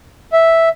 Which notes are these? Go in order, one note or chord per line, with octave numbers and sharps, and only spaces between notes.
E5